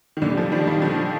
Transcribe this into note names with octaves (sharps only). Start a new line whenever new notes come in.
D#3
A#2 D3
G3
D3 F3
D#3 G3
D#3 G3
D3 F3